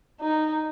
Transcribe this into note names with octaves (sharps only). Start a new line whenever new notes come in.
D#4